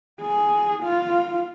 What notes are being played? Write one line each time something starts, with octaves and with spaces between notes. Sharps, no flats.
G#4
F4